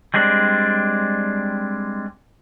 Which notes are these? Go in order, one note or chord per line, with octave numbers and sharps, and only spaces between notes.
G3 G#3 C4 D4